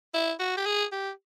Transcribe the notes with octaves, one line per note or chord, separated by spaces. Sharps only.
E4
F#4
G4
G#4
G4